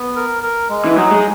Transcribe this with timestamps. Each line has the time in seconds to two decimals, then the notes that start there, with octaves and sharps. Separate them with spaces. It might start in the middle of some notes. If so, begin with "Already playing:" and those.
Already playing: B3
0.16 A#4
0.43 A#4
0.69 G#3
0.85 E3
0.97 F#3 D#4
1.11 G#3